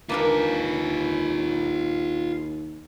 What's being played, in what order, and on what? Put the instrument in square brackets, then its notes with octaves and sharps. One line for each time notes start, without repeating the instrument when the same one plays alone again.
[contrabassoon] D#2 [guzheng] A#3 D4 A#4 [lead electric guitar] F4 B4